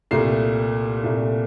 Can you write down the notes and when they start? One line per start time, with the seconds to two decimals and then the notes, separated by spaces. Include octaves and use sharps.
0.11 C2 A#2 A3 C7
1.04 C2 A#2 A3